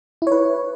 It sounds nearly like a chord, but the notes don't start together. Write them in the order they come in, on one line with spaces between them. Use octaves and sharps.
E4 C#5 B4